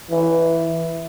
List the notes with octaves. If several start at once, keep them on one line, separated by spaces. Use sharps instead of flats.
E3